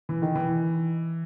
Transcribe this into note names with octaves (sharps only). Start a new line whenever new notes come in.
E3
D#3
E3